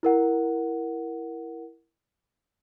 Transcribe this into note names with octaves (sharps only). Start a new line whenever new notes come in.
E4 A#4 F#5